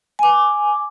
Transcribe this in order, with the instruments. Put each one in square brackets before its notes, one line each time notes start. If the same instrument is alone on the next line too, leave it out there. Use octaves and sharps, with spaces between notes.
[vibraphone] G#5 D6